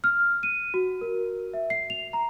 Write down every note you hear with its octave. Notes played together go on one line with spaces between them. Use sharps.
F6
D#7
F#4
A#4
E5
C7
F7
A#5